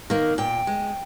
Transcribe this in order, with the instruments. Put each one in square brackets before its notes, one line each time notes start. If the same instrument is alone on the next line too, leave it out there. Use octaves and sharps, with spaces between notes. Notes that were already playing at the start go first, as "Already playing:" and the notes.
[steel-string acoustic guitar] D#3 A#3
A#2 G5
G#3